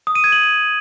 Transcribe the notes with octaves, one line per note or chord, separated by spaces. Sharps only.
D#6
D#7
G#6
F#7